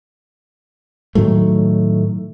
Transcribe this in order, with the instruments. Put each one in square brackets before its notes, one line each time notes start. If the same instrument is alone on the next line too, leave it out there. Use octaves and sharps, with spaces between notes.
[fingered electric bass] A2 D#3 F#3 A3